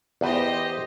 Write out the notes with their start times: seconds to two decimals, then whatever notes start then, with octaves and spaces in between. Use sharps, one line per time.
0.21 E2 G4 B4 C5 D#5